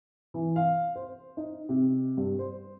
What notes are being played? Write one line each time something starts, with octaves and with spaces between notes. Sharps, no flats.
E3
F5
C5
D#4
C3
G2
C5